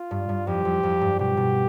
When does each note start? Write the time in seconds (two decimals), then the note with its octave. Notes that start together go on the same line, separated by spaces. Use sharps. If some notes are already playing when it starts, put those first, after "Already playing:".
Already playing: F4
0.11 G2
0.29 G2
0.47 F2 G4
0.65 F2
0.83 F2
1.01 G2
1.19 B2 G4
1.37 B2